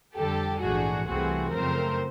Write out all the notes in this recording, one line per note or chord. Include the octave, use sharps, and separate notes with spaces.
F2 D3 G3 G4 A4
A#1 G#2 E3 A3 D4 F#4 G#4
C2 C3 E3 A3 C4 F#4 G#4
F#2 C#3 F3 A3 C4 A#4 C5